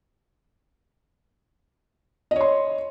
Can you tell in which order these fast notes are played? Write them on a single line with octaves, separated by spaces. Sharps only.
D#5 C#5 C6